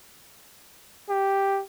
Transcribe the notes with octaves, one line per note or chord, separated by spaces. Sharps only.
G4